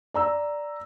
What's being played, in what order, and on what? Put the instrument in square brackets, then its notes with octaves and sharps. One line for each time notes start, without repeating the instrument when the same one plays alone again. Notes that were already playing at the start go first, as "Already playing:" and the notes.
[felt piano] D5 A#5 E6